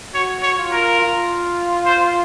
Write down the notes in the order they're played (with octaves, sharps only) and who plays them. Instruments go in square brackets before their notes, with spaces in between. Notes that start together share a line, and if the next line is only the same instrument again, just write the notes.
[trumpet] F#4 [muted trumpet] C#5
[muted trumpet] C#5
[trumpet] F4
[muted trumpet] A#4
[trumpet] F4
[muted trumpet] C5